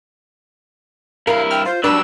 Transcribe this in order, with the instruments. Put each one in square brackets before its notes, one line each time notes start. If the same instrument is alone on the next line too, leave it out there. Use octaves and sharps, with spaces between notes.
[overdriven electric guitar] G2 E4 [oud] A#4 [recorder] F5
[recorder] G5 [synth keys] F6
[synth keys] F4 [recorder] C5
[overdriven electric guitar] F#3 G4 [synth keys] D4 [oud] B4 [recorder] E6